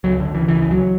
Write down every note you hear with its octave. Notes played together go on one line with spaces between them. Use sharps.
C#2 F#3
C#2 D3
C#3 E3
C#3 E3
C#2 E3
F#3